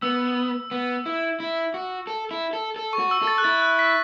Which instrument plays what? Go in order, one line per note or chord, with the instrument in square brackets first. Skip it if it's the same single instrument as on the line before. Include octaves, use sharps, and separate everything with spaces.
[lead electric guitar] B3 [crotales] E6
[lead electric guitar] B3
E4
E4
F#4
A4
E4
A4
A4
[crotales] C#6
[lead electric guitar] F#4
[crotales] E6
[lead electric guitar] A4 [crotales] A6
[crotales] F#6
[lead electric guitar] E4 [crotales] A6
[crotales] F#6
B6